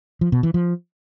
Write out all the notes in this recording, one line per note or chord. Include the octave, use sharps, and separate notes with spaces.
F3
B2
E3
F3